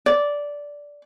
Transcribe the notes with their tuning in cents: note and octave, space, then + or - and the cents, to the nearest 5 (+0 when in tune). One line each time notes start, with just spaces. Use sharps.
D5 -10